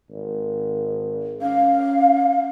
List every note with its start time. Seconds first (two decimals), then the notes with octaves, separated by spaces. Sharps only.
0.11 G#1
1.42 C#4 F5